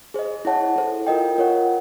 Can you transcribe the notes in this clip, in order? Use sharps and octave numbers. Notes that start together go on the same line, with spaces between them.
G#4 C5 D#5
E4 G#4 C#5 F#5 A5
E4 A4 C5
F4 A#4 D#5 G5
F4 A#4 C#5 F#5